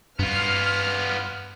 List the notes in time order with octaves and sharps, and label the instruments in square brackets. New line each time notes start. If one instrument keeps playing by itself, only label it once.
[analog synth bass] G2 [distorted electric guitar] B3 F4 [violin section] F6